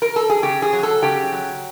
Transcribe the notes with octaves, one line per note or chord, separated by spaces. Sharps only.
A#4
A4
G#4
C#3 G4
G#4
F#3
A4
C#3 G4
F#3